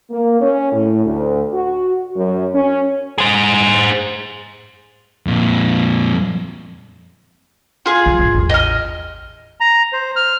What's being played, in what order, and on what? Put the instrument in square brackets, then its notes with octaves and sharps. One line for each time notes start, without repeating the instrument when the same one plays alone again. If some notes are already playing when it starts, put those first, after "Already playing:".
[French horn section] A#3
C#4
A2
D2
F#4
F#2
C#4
[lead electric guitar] G#4 C5
[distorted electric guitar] F2 A#2
[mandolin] F4 G#4
[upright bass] C3 F#3
F2 G#2
A1 E2
[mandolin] D#5 F6
[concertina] A#5
C5
F6